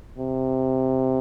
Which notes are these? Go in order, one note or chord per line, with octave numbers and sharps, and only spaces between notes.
C3